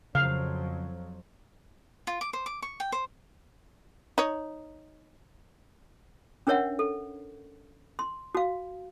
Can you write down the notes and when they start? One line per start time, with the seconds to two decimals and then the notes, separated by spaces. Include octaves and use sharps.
0.15 F2 C#3 F3 F#3 F5
2.07 F4
2.21 D6
2.33 C5
2.46 D6
2.62 C#6
2.80 G5
2.92 C5
4.18 D#4 C#5
6.47 C#4 D4 A#4 C#5 E5 F#5
6.79 A4
7.99 C6
8.35 F#4 F5